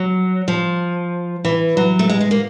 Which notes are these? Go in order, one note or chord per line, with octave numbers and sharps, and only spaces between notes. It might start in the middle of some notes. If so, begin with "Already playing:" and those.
Already playing: F#3
F3
E3
F#3
A3
G#3
G#3
A#3